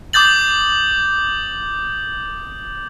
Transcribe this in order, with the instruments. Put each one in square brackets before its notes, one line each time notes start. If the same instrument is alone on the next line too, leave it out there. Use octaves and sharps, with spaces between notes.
[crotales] D6 D#6 G6 A6 F#7